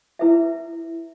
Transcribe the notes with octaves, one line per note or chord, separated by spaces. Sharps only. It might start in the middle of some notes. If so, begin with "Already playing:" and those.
E4 B4 E5